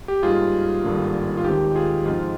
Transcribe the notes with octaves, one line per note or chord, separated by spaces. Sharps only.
G4
G#2 G3 A#3 F4 G#4
G#1 G2 D3 G3 A#3
F4
D#2 D#3 G#3 C4 G4
F4 G#4
G#2 F3 G#3 C4 F4